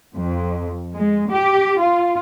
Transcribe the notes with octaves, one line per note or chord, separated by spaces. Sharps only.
F2
G#3
G4
F4